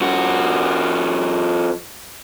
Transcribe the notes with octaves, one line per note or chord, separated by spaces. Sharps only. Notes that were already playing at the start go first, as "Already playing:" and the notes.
F2 F#4